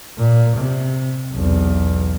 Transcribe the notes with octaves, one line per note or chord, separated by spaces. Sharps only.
A#2
C3
B1 E2